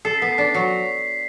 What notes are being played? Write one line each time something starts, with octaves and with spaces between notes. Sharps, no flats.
A4 C7
B3 B6
C7
D4
F#3